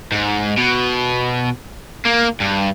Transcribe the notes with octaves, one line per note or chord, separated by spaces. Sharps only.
G#2
B2
A#3
G2